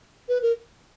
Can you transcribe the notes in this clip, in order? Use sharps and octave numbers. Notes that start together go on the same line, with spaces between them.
B4
A#4